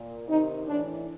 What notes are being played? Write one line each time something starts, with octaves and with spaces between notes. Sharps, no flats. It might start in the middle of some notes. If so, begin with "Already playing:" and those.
Already playing: A#2
C3 D#3 D#4
A2 E3 D4